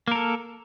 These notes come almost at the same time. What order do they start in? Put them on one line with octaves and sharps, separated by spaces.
A#3 A#4 A4